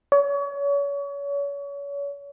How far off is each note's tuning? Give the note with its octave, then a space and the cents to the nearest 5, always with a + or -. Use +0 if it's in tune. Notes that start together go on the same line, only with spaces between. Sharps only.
C#5 +35